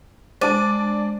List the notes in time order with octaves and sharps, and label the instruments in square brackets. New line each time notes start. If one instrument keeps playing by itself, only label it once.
[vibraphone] G#3 [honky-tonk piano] D4 D6 D#7 [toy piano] C5 A5 [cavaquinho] D5